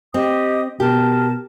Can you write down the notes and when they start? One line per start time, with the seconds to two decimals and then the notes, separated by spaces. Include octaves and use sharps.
0.14 C4 G4 D#5 D#6
0.80 B2 G4 A#4 A5